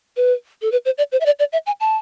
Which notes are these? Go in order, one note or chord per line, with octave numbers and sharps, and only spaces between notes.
B4
A4
B4
C5
D5
C5
E5
D5
D5
E5
G#5
A5